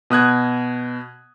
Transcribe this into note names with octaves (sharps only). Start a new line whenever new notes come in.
B2 D#6 F#6 G#6